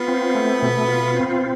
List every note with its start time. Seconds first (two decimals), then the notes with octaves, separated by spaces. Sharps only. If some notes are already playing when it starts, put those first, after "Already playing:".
Already playing: B3 F4
0.08 C4
0.35 A3
0.62 B2
0.88 F4
1.15 C4